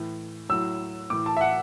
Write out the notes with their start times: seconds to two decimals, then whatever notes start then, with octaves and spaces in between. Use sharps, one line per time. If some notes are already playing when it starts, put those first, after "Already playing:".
Already playing: A2 E3
0.49 A2 F#3 E6
1.10 A2 E3 D6
1.26 A5
1.37 E5
1.41 F#5